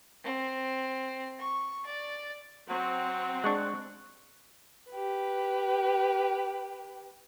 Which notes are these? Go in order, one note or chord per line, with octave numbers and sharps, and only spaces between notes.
C4
C#6
D5
F#3 C4
G#3 D4 C#6 F#6
G4 B4